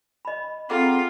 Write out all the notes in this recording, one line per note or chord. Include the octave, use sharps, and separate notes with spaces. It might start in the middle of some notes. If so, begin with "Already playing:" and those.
D#5 B5
C4 F4 G#4 A4 F#5 G5 A#5 D6